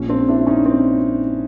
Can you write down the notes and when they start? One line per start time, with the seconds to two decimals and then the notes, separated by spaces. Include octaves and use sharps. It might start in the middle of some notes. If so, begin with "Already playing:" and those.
Already playing: A#1 A#2 F3 C#4
0.09 C4 D4
0.28 D4 E4
0.47 C#4 D#4
0.66 C4